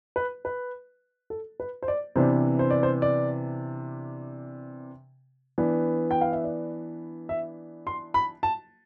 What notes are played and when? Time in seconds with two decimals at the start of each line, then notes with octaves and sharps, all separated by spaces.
0.16 B4
0.45 B4
1.30 A4
1.60 B4
1.82 C5
1.88 D5
2.15 C3 E3 B3 D4 C5
2.59 C5
2.71 D5
2.83 C5
3.02 D5
5.58 E3 B3 D4
6.11 G5
6.21 F5
6.33 E5
6.44 D5
7.29 E5
7.87 C6
8.14 B5
8.43 A5